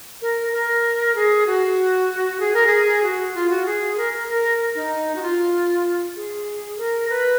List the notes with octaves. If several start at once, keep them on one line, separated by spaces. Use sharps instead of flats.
A#4
A#4
G#4
F#4
G#4
A#4
G#4
F#4
F4
F#4
G#4
A#4
A#4
A#4
D#4
F#4
F4
G#4
A#4
B4